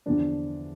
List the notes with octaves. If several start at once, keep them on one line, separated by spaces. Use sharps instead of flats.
E2 D3 F3 D4